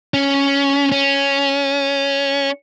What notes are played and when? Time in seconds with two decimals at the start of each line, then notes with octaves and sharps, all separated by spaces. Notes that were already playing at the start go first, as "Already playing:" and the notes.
0.14 C#4
0.92 C#4